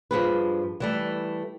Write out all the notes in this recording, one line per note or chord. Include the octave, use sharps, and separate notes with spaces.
G2 F3 G#4 B4
E3 G3 A3